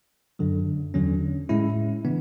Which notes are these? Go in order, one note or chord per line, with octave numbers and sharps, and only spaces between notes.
F#2 D3 F#3
E2 D3 F#3 C#4
A2 G#3 C#4 E4
C#3 E3 B3 D4